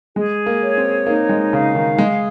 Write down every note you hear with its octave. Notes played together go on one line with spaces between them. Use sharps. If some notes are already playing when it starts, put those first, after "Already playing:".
G#3 G#4
A#3
C#5
C4
A#3 D#4
G#3
C#3 F5
D#3
G#3 G#4